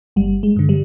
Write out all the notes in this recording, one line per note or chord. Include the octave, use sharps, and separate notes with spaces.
G1 G3
G#3
G2 D3
G3